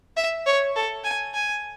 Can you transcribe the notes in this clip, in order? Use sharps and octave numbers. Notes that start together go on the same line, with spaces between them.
E5
C#5
A4
G#5
G#5